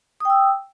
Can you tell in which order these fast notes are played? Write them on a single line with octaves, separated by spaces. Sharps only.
D#6 G5 E6